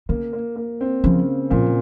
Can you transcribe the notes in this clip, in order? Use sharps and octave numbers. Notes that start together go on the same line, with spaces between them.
C#3 A#3
A#3
A#3
C4
C#3 F3
A#2 F3